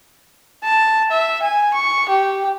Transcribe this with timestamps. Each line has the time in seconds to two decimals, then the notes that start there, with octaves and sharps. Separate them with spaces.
0.64 A5
1.11 E5
1.42 G#5
1.74 C#6
2.09 G4